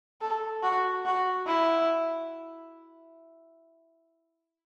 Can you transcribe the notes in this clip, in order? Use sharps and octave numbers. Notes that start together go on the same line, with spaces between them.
A4
F#4
F#4
E4